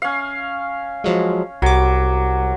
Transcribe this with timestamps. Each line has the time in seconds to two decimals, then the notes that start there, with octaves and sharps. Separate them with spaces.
0.02 C#4 F5
1.04 F3 F#3 G#3
1.62 C2 F#3 D6